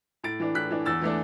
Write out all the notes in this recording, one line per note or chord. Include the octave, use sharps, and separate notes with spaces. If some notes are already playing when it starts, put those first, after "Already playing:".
A2 A6 D7
E3 D4
A2 F#6 B6
E3 D4
E2 E6 A6
E3 A3 D4